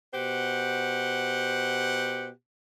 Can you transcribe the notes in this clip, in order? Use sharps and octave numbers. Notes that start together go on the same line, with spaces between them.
B2 G4 C5 F#5